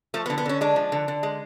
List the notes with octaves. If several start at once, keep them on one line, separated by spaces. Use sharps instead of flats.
F3 A3
B3
D3
B3
D3 C#4
G#3 D4
F3
D3
D3
G#3